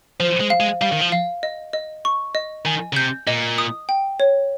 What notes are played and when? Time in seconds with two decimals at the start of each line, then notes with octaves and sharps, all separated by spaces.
0.20 F3 C5
0.40 G#3
0.50 F5
0.60 G#3
0.81 G3 F5
0.92 D#3
1.01 F3
1.12 F5
1.43 D#5
1.73 D#5
2.05 C#6
2.35 D#5
2.65 D#3 G#5
2.93 C#3
2.96 C3 G6
3.27 A#2 D#5
3.58 D#6
3.89 G5
4.20 C#5